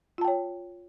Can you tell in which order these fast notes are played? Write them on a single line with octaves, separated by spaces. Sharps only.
F4 A5 G5 C#5